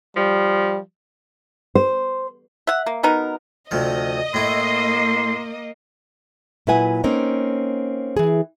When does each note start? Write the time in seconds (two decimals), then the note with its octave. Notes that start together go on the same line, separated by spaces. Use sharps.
0.17 F3 G3
1.75 C5
2.67 E5 F#5
2.86 A#3
3.03 B2 B3 D#4 A#4
3.71 D2 C3 F3 D#5
4.34 A2 A#3 E4 C6
6.67 A#2 F#3 E4 B4 F#5 G#5
7.04 A#3 C4 C#4 D#4
8.17 E3 G#4